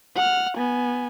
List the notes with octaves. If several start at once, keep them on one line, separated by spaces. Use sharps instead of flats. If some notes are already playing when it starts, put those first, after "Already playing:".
F#5 F6
B3 G#5